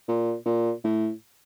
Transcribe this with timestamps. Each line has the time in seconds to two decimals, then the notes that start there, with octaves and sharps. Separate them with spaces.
0.08 A#2
0.46 A#2
0.84 A2